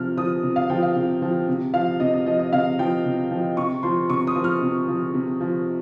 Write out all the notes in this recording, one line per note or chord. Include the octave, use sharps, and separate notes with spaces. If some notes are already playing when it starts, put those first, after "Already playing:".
Already playing: C3 F3 F6
F3 D#6
C3
F5
F3 G5
F5
C3
F3
C3
F3 F5
C3 D#5
D#5
F3 D#5
D#5
C3 F5
F3 G5
C3
F3
C3 C#6
F3 C6
C3 C#6
D#6
F3
F6
C3
F3
C3
F3